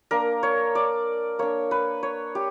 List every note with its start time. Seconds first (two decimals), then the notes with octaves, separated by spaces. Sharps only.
0.11 A#3 D4 A#4
0.43 C#5
0.75 D5
1.39 A#3 D4 C#5
1.71 B4
2.03 C#5
2.35 G4